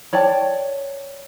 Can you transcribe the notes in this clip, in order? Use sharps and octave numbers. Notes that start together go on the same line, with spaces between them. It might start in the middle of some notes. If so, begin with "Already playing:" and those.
C#5 D5 G5 A5